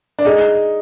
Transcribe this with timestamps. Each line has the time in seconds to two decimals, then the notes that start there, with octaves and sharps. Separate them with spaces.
0.19 D4
0.25 D#4 G#4